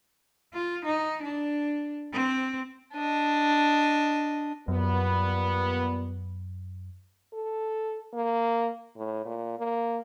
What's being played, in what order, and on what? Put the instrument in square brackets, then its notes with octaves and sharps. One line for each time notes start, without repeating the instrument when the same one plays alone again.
[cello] F4
D#4
D4
C4
[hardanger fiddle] D4 D#5
[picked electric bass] F#2 [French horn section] A#2 G3 B3
[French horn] A4
A#3
A2
A#2
A#3